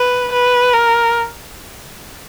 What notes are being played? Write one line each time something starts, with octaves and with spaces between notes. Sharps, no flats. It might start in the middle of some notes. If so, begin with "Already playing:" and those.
Already playing: B4
B4
A#4